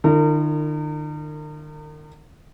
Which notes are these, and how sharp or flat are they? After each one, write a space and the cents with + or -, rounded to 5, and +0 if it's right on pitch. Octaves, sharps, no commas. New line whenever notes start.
D#3 -45 E4 +30 A#4 -35